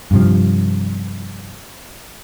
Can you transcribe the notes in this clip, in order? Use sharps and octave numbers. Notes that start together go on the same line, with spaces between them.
G2 C3 F3